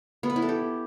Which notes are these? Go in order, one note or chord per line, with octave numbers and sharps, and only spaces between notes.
B3
B4
E4
A4
G4